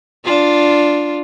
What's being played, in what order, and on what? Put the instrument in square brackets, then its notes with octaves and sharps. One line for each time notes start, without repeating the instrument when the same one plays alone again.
[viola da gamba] D4 F4